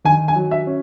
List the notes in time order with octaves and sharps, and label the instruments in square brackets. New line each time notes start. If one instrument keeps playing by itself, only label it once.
[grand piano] D#3 [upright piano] G#5
[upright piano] G#5
[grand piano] F#3
[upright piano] E5
[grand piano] C#4